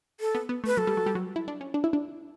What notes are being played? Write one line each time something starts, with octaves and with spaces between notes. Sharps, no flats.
A4
B3
B3
A3 B4
F#3 A4
G3
F#3
G3
F#3
E4
D4
C#4
D4
E4
D4